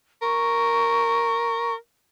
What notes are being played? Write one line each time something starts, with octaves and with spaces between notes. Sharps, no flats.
A#4 C#6